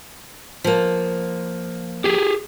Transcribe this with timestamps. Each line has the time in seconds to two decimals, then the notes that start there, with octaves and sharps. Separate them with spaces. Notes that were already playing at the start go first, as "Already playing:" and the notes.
0.64 F3 A#3
2.04 G4 G#4